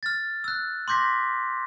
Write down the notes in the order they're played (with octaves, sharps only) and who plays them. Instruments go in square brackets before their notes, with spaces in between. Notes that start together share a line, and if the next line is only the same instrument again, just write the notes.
[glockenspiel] F6 A6
E6 F#6
C6 D6 G6 A#6 B6